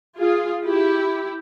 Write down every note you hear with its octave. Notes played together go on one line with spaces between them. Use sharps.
F4 G#4
E4 G4